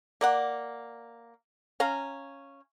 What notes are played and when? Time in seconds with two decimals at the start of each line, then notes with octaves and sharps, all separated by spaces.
0.21 A#3 D5 F#5
1.80 C#4 F5 A#5